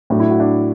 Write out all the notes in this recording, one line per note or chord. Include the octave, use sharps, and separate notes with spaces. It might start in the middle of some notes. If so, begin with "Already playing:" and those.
A2 F#3 D4
E4
F#4
D4